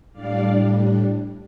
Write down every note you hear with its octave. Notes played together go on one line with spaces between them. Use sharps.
A2 G3 D4 D5 F5